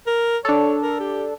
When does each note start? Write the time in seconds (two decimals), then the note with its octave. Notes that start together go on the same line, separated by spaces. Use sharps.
0.07 A#4
0.45 D4 A4 C#5
0.82 A#4
1.00 G4